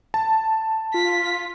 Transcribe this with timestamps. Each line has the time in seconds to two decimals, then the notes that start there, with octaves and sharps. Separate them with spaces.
0.14 A5
0.94 F4 B6